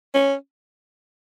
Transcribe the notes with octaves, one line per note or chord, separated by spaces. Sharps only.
C#4